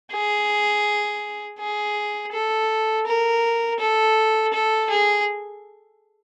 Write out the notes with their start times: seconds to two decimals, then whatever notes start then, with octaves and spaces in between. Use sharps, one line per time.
0.12 G#4
1.59 G#4
2.32 A4
3.06 A#4
3.79 A4
4.53 A4
4.90 G#4